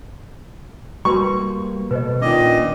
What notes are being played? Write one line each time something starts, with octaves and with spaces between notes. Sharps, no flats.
G3 A#3 F#4 B4 C6 C#6
B2 A4 B4 C5 D#5
A#2 D#3 C#4 D4 D#5 D6